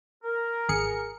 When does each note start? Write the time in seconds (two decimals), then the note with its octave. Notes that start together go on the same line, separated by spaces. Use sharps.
0.23 A#4
0.69 G#1 G#4 C#7